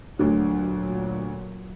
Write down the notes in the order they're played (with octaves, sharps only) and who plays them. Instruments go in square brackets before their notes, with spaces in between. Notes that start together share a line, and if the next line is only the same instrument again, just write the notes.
[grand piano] D2 D3 [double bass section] A#2 F#3